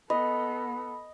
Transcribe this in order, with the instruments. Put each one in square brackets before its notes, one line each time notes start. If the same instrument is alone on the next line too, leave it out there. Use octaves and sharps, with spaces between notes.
[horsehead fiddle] B3 A4 [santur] D#5 [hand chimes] B5